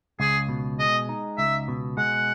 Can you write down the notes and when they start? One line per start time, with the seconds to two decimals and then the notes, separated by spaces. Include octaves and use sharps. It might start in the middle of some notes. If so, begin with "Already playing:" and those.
0.20 C#2 G#4
0.49 B2
0.79 G#3 D#5
1.09 D#4
1.38 C#2 E5
1.68 B2
1.97 G#3 F#5